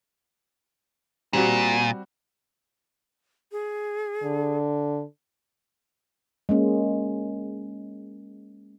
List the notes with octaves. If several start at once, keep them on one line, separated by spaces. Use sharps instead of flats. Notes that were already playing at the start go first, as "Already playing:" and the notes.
A#2 G3 C4 F#4
G#4
D3
G#3 A#3 C#4